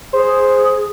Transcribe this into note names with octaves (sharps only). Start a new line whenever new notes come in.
G#4 C5